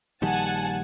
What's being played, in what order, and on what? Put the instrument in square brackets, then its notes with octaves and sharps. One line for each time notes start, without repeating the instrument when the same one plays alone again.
[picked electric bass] A#1 D#3 G3 [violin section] F#5 G#5 A5